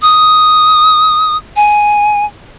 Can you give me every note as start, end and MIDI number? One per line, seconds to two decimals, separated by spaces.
0.02 1.37 87
1.56 2.25 80